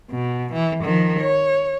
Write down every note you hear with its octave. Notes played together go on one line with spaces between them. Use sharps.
B2
E3
D#3 F3
C#5